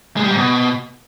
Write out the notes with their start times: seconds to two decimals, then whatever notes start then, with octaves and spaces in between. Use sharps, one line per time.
0.17 G#3
0.24 G3
0.31 G#2
0.38 B2